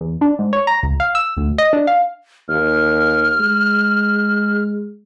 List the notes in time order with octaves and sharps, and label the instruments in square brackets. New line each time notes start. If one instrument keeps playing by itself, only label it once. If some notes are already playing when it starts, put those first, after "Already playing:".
[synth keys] E2
D4
G#2
C#5
A#5
C#2
F5
E6
D2
D#5
D4
F5
[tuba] D#2 [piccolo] F6
[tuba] G#3